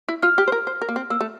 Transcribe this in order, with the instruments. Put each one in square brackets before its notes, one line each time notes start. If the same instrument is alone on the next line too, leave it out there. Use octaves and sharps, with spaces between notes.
[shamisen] E4
[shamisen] F4 [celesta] F6
[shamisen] G4
C5
A#4
C5
A#4
A#3
C4
[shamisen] A#3 [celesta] E6
[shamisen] A3